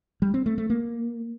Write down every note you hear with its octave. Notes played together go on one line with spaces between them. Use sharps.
G3
C4
A3
A3
A#3